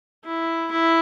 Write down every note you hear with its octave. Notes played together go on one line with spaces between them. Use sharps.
E4
E4